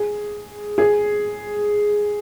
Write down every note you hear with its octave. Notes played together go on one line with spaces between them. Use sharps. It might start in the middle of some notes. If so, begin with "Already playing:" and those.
Already playing: G#4
G#4